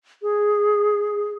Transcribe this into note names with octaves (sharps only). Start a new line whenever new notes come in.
G#4